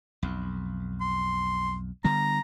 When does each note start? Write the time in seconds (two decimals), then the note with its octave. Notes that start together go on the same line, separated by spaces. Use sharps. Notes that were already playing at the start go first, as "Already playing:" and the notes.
0.23 B1 F2
1.01 C6
2.04 D3 G3 B3 A#5